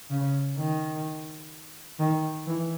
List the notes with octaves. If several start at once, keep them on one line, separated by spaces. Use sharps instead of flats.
C#3
D#3
D#3
E3